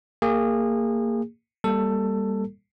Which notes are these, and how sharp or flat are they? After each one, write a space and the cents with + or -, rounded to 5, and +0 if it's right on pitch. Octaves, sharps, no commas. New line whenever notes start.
A#3 -20 G#4 -30
G3 +15 A#3 +0 A4 +15